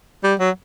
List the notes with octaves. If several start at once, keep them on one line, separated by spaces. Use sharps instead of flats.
G3
F#3